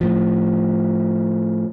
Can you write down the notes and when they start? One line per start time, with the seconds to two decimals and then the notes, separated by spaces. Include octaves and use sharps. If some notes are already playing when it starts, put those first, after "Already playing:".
0.01 A2 F3